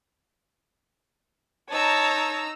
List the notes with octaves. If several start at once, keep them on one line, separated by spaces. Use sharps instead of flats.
D#4 C#5 A5 A#5 E6